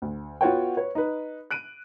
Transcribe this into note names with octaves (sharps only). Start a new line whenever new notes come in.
D2
B3 F4 F#4 C#5 G5
B4 C#5
D#4 B4
F#6 D7 D#7